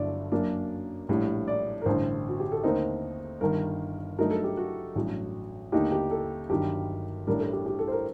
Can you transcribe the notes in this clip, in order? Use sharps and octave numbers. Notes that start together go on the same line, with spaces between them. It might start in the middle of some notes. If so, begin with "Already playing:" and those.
Already playing: G1 G2 D3 F#3 A3 D5
F#2 F#3 A#3 D4
A#1 A2 G3
D5
A#4
A1 G2 D3 C5
F#4
G4
A4
D#2 D3 A3 C4 D#4 A#4
G1 G2 D#3 A#4
G2 F#3 A3 D#4 A#4
A4
G4
F#4
A1 G2 F#3
D#2 D3 A3 D#4 G4
G4
A4
G1 G2 D#3 F#3 G4
A1 A2 G3 D4 A#4
A4
G4
G4
A4
C5
A#4